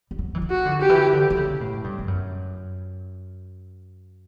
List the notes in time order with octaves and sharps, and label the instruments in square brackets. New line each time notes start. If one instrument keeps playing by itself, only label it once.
[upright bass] G3
F#3
E3
F#3
[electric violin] F#4
[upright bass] D3
[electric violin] G4
[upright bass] E3
D3
D3
C#3
A2
G2
G2
F#2